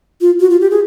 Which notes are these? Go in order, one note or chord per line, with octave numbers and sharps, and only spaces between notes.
F4
F#4
F4
G4
G#4